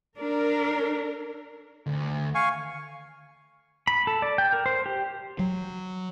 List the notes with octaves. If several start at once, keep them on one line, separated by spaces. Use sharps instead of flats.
D4 A#4
D2
F5 G#5 C#6
B5
A4
D5
G5
A#4
C5
G4
F#3